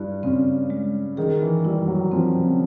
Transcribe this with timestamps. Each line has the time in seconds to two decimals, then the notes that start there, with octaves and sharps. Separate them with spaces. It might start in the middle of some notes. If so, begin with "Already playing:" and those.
Already playing: G2 E4
0.23 C#3 C4
0.70 G#3
1.17 D#3 G#4
1.41 E3
1.64 G3 E4
1.82 G3
1.88 F#3
2.12 F3 C4
2.37 C3
2.44 C#3